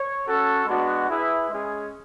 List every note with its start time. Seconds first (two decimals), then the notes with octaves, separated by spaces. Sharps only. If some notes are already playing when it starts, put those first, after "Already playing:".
Already playing: C#5
0.26 C#4 F#4 A4
0.66 G#3 B3 D4 F#4
1.08 E4 G#4 B4 E5
1.49 G#3 C#4 G#4